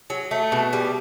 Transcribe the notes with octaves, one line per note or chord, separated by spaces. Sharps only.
F#3
A3
B2
G3